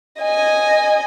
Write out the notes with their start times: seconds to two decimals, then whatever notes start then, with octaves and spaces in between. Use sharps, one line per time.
0.22 D#5 G#5